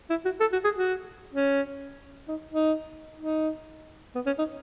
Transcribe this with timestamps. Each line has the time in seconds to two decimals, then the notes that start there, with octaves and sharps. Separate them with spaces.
0.10 E4
0.25 F#4
0.40 A4
0.53 F#4
0.64 G#4
0.76 F#4
1.34 C#4
2.28 D#4
2.51 D#4
3.21 D#4
4.15 B3
4.26 C#4
4.39 D#4